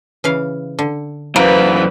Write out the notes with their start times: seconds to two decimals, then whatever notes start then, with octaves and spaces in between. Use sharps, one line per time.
0.24 C#3 E3 F5
0.79 D3
1.36 F#2 E3 A#3 B4 C5